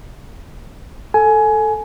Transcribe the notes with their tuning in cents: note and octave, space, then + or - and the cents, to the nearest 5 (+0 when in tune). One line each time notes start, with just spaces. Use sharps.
A4 +0 G#5 +20